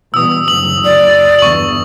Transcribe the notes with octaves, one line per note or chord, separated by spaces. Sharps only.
B2 E3 G3 D#6 E6
F#1 D2 F#3 D#6 F#7
D5
G1 E2 E3 C#6 F#7